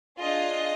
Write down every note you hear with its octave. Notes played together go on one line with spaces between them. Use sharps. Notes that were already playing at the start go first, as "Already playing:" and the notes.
D4 F4 G#4 D#5